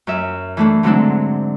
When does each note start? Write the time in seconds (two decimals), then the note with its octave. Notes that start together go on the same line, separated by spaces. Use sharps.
0.07 F#2 E5
0.57 E3 A3 D4
0.83 G#2 D3 F#3 C4 D4 E4